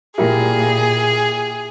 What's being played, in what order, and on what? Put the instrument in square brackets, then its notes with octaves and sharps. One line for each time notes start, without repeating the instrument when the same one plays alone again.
[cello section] A#2 [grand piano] E4 G4 A#4 [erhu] G#4